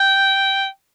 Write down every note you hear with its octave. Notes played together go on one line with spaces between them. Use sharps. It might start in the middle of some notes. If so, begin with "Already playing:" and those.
Already playing: G5